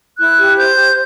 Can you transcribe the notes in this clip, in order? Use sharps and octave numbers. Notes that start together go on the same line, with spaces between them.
E4 F#6
G4
C5 G6
G4